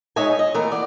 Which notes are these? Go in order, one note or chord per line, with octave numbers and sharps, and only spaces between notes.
G#3 D#4 C#5 D#5 E5 G#5
D#5
E3 A3 A#3 A#4
D5 F#5